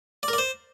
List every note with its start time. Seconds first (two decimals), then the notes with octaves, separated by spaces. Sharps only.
0.23 D5
0.28 A#4
0.33 D5
0.38 C5